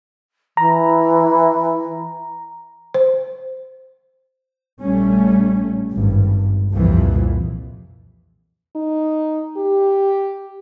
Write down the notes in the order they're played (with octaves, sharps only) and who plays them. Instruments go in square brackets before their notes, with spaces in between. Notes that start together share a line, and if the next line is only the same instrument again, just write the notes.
[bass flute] E3 [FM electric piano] A#5
[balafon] C5
[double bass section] A#1 G3 A3 C#4
G#1 G2
C2 F2 A#2 E3 F3
[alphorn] D#4
G4